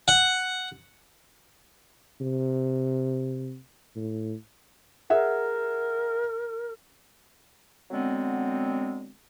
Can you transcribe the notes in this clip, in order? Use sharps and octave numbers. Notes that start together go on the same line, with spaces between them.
F#5
C3
A2
G#4 A#4 E5 F#5
D3 F#3 G#3 B3 C4